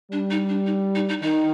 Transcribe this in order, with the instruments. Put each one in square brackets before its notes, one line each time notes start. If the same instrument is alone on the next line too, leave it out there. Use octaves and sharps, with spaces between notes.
[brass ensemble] G3 [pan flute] D4
[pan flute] D#4
D4
D#4
D#4
D#4
[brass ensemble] D#3 [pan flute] D#4